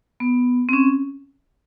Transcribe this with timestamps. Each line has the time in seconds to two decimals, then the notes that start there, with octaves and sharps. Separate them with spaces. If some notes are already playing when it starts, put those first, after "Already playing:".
0.20 B3
0.69 C4
0.73 C#4